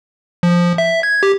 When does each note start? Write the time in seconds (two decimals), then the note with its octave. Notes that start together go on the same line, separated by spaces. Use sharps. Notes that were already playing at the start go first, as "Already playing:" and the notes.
0.43 F3
0.78 E5
1.03 G#6
1.23 G4